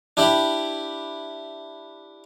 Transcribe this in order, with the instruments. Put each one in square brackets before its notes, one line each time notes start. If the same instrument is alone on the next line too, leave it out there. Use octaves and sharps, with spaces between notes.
[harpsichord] D4 E4 G4 G5 B5